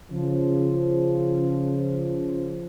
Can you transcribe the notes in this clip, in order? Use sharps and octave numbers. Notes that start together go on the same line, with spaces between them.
C#3 F3